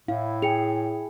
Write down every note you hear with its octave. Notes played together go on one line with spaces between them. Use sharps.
A2 E4 F5
G#4 G5 C#7 F7